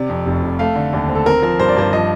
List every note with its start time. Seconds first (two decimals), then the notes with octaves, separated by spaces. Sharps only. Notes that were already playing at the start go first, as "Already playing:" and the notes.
Already playing: C3 D5
0.09 F2
0.26 F1
0.43 F1
0.59 A3 F5
0.76 D3
0.93 D#2
1.09 C4
1.15 A4
1.26 C4 A#4
1.42 F3 A#4
1.59 G2 C5
1.69 D5
1.77 G2 C5
1.92 F3 D#5